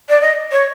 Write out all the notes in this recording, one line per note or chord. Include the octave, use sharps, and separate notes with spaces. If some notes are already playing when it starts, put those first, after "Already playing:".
D5
D#5
C#5